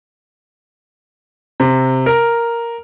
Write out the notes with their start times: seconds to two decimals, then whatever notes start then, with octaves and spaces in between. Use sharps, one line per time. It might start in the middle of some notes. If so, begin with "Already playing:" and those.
1.60 C3
2.06 A#4